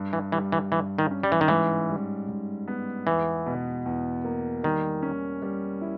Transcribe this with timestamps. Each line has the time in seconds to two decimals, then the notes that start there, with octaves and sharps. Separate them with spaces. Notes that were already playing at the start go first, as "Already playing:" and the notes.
Already playing: G2
0.13 E3
0.32 E3 G3
0.52 E3
0.72 G2 E3
0.98 D#3
1.11 C#4
1.23 G3
1.32 E3
1.41 D#3
1.48 G#2 E3
1.90 G3
2.28 G#2
2.68 B3
3.06 E2 E3
3.46 B2
3.86 E2
4.25 A#3
4.63 D#3 G3
5.02 C#4
5.42 G3
5.81 E4